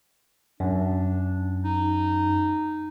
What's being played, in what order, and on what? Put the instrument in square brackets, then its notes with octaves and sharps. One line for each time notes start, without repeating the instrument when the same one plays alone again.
[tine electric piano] F#2 [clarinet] D4
[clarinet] D#4